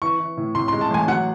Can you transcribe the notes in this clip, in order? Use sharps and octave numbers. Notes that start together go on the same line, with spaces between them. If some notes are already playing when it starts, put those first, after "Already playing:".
E3 C#6
E3
A2
A2 C6
C6
G#3
A5
A1 G#5
F#3 F#5